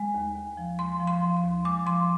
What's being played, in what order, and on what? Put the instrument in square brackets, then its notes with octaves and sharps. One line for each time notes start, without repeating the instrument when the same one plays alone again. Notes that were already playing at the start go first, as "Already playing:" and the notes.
Already playing: [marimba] G#3
D#2
D#2
F3
G#3 C6
F3
C6
F3
C6
D#2
G#3 D6
F3 C6